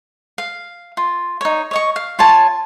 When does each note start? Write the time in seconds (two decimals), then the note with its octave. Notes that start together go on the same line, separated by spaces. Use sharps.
0.38 F5
0.97 F4
1.41 D#4 C#5
1.71 C#5 D#5 C#6
1.96 F5
2.19 F4 C#5 G#5 A5